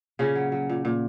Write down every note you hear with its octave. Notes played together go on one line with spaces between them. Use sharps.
A#2 C#3 C#4
F#3
F#3
A#2
A#2